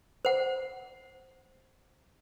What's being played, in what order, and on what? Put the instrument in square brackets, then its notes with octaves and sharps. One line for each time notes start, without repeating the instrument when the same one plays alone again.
[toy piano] C5 F#5